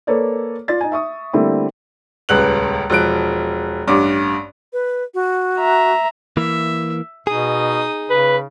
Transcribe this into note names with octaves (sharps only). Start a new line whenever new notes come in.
A#3 A4 B4 C#5 D5
F4 D5 A6
D#4 G#5
E5 C#6 D#6
D3 G3 A3 A#3 C4 E4
D#1 C#2 B4 F#6 F#7
E1 F3 F#6 D7
A1 G2 D6
B4
F#4
E5 A#5
E3 A#3 E5
B2 D#4 G#4 D#6
C#3 B4